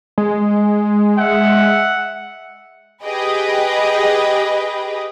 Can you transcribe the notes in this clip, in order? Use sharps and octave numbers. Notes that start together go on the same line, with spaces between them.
G#3
E5 F#5
G4 G#4 B4 D#5 G5